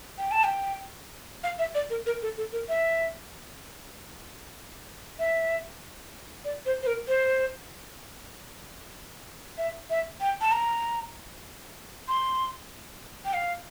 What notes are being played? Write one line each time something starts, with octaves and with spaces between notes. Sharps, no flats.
G5
A5
G5
F5
E5
D5
A#4
A#4
A4
A4
A#4
E5
E5
D5
C5
C5
A#4
C5
E5
E5
G5
A5
A#5
C6
G5
F5